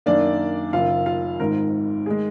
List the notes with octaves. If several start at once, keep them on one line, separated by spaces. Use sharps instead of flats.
F#2 D#3 A#3 D4 D5
F#1 F#2 D#3 F4 F5
F4 F5
G#1 G#2 D#3 A#4
D#3 G#3 G#4